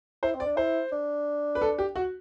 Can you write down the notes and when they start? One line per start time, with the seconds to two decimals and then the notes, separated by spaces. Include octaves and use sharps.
0.23 E4 C5
0.34 C4
0.40 D5
0.46 D4
0.57 E4 C5
0.92 D4
1.55 B4
1.62 A4
1.78 G4
1.96 F#4